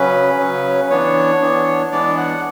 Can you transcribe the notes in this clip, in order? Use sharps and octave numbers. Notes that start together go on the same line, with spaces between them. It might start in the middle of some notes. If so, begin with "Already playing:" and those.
Already playing: C#3 F#3 C#4 B4
C#3 F#3 C#4
E3 B3 D4 C#5
E3 B3 D4
E3 G#3 B3 D4 D5
F#5